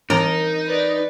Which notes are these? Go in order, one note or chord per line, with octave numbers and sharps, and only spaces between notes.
E3 C4 D#4 A#4
B4 D5